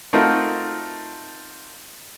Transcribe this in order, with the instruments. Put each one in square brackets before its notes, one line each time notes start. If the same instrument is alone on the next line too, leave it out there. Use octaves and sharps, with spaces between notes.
[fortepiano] A3 C4 D#4 F4 F#4 A#4